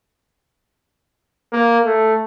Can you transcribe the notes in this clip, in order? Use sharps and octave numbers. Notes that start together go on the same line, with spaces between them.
A#3
A3